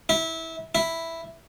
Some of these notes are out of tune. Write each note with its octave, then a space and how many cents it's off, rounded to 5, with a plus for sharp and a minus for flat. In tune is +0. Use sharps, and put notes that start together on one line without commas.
E4 -20
E4 +0